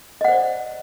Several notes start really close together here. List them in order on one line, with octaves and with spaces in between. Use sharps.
D#5 F#5 C5 D5